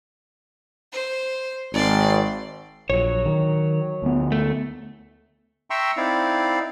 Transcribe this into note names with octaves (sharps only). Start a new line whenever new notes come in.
C5
G#1 D5 C6
A#1 F#3 C#5
D#3
D2 B3
A3
E5 G5 A#5 C6 C#6 E6
C4 D#4 E4 D5 F5